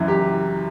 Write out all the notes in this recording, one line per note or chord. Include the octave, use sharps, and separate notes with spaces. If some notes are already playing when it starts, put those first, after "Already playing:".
Already playing: F#1 F#2 E3
G4